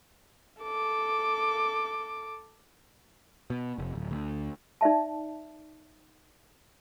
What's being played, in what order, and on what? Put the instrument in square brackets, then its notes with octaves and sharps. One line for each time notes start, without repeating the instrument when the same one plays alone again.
[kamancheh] A4 D6
[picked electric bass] B2
F1
D1
D2
[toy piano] D#4 D5 E5 A5